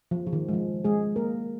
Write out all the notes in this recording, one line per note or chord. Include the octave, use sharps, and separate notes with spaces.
F3
F3
D#3
G#3
F3
G#3 G#4
A#3 A#4